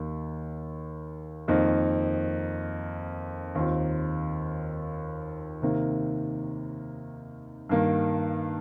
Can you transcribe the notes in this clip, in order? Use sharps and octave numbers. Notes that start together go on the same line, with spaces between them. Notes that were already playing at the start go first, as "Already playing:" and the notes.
Already playing: D#2 D#3 A#3
F2 D#3 A#3 D#4
D#2 D#3 C4 F4
C3 D#3 A#3
G2 D#3 A#3